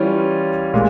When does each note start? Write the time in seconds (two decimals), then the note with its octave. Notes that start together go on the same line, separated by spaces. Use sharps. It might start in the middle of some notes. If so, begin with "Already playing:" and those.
Already playing: E3 G3 C#4 F4
0.74 A#2 G#3